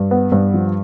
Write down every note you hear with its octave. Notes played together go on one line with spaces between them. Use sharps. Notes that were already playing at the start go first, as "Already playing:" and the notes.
Already playing: G2
B3
G2
F3